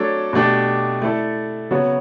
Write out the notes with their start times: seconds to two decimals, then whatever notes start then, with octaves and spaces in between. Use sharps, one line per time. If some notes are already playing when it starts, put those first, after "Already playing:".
Already playing: F#3 A3 D4 A4 C#5
0.33 B2 A3 D4 G4
1.02 A3 E4 A4 D5
1.70 C#3 F#3 B3 F#4 C#5